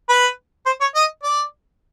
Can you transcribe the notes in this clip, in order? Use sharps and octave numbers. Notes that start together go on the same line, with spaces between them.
B4
C5
C#5
D#5
D5